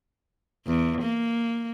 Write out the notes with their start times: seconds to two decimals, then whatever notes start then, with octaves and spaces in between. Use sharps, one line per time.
0.67 E2
1.02 A#3